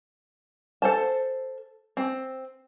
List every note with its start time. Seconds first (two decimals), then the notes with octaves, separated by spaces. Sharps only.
0.82 A4 C5 A5
1.97 C4